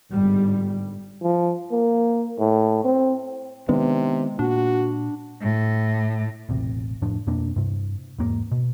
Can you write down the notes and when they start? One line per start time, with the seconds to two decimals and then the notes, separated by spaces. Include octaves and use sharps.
0.11 G1 G#2 G3
1.23 F3
1.71 A#3
2.38 A2
2.84 C4
3.69 C3 D#3 G#3 B3 D4
4.39 A#2 D4 F#4
5.42 A2
6.49 E1 A1 C3
7.02 F1 A2 F3 D4
7.27 F2 B2 A#3 D4
7.56 G2 C3
8.19 E2 G#2 A#3
8.51 B2